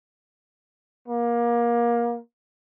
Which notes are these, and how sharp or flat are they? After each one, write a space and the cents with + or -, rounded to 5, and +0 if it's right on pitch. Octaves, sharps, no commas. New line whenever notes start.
A#3 +25